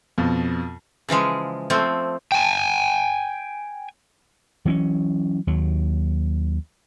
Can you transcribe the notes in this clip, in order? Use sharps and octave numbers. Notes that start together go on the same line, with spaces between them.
F2 B2
C#3 E3 F3 G#3
F3 A3 C4
G5 G#5
E3 F#3 A#3 C#4
D#2 F#3